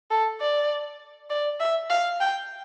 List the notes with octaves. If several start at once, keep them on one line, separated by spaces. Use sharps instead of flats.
A4
D5
D5
E5
F5
G5